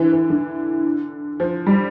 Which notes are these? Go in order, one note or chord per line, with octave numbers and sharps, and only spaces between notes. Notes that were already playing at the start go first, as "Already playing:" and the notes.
Already playing: D3 E3
E3
D3
F3
G3